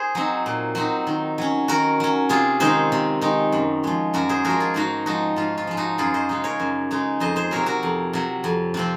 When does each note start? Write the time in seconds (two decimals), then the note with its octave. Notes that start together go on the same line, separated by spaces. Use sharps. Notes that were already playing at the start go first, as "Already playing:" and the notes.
Already playing: G#4 C5
0.15 F#3 C4 D#4
0.46 A#2
0.75 F#3 C4 D#4
1.07 D#3
1.38 F#3 C#4
1.68 D#3 F#4 A#4
2.00 F#3 C#4
2.29 C3 F4 G#4
2.60 D#3 G#3 D#4 G#4 C5
2.92 C3
3.21 D#3 G#3 D#4
3.52 F#2
3.84 F3 G#3
4.14 F#2 F#4 A#4
4.29 G#4 C5
4.45 F3 F#4 A#4
4.50 G#3
4.60 F4 G#4
4.74 G#2 D#4 F#4
5.06 F3 G#3 D#4 F#4
5.36 G#2 F4
5.57 F4
5.67 F3 G#3
5.77 D#4 F#4
5.98 F#2 F4 G#4
6.14 C5 D#5
6.29 C#3 G#3 D#4
6.44 A#4 C#5
6.60 F#2
6.91 C#3 G#3 D#4
7.20 F2 C5 D#5
7.36 G#4 C5
7.51 C3 F#3 A#4 C#5
7.66 F#4 A#4
7.83 F2
8.13 C3 F#3
8.44 F2
8.74 C3 F3 C4